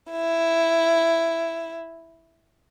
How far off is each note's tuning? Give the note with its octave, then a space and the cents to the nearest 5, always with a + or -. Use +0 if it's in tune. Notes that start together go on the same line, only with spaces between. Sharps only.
E4 +5